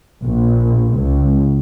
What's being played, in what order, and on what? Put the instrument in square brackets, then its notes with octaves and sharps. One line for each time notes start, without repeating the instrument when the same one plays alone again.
[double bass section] A#1
C#2